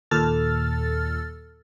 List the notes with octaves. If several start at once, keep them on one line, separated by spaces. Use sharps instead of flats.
D#2 A#2 A4 E6 F6 A6